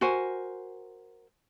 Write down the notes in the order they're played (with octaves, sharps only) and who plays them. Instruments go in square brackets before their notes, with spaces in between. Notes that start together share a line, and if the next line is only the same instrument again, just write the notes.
[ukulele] F#4 A#4 C5 G#5